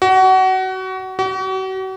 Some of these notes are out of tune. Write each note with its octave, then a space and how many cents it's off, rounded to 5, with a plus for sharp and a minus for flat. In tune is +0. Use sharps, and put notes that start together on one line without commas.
F#4 +25
F#4 +40